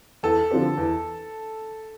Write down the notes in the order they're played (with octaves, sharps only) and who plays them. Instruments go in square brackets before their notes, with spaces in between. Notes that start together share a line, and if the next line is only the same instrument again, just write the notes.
[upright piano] E2 [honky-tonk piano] A4
[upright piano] D3 F3 C4 G4
E2